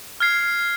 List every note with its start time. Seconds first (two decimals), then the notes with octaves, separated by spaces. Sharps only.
0.20 F6 G#6 C7